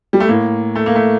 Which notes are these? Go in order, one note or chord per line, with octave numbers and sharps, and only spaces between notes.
G3
A3
A2 A#3
A3
A#3
A3